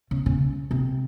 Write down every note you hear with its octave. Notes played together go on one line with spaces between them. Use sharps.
C#3
C#3
C3